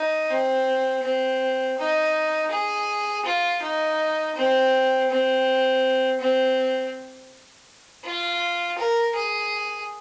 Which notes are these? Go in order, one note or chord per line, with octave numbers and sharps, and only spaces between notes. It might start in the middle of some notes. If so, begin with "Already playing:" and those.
Already playing: D#4
C4
C4
D#4
G#4
F4
D#4
C4
C4
C4
F4
A#4
G#4